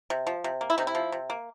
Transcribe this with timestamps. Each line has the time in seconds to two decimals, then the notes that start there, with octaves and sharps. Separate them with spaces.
0.10 C3
0.27 F3
0.44 C3
0.61 A#3
0.70 E4
0.78 C3 D#4
0.87 E4
0.95 F3
1.12 C3
1.30 A#3